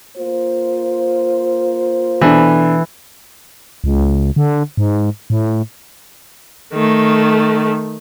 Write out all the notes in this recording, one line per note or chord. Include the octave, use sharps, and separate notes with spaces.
A#3 F4 C5
B2 E3 D4 A4
C#2
D3
G#2
A2
D#3 A3